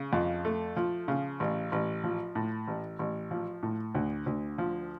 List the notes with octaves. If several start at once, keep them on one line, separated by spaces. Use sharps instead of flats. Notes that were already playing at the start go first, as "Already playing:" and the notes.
Already playing: C#3
F2
A3
F3
C#3
A1
A1
F3
A2
A1
A1
F3
A2
D2
D2
F3